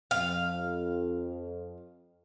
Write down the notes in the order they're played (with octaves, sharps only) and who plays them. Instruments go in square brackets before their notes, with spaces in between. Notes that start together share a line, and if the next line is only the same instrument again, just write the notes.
[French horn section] F2 [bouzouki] F5